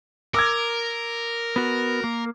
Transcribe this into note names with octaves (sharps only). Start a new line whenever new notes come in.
A#4 D6 E6 G#6
B3 F#4
A#3